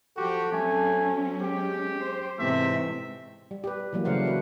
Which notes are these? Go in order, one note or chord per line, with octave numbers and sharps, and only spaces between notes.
F3 F#4 G4 A4
F#3 A3 C4 C#4 G#5
G#3 G4
C5
G#2 C3 E3 G#3 A3 C4 E5
G3
G4 B4
E3 F#3 G3 A#3
C#3 F#3 A3 C5 F5 F#5
F#4 B4